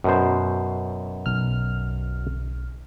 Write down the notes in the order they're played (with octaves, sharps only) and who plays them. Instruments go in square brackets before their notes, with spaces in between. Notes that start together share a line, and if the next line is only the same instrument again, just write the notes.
[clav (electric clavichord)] F#2 B2 C5
[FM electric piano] B1 F6